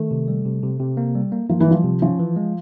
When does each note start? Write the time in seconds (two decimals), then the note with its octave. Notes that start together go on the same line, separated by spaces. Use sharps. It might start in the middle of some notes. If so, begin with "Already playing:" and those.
Already playing: D#3 A3
0.11 C3
0.28 G3
0.45 C3
0.63 C3
0.80 C3
0.97 A#3
1.15 G3
1.32 A#3
1.49 F3 A#3
1.60 E3
1.67 F3 G3
1.84 C3
2.02 F3 C#4
2.19 E3
2.36 G#3